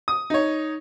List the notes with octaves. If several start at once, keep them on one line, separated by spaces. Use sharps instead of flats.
D#6
D#4 C#5